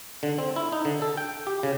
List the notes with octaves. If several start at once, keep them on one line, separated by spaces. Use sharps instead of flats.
D3
C4
E4
D#4
D3
A4
G5
G4
C#3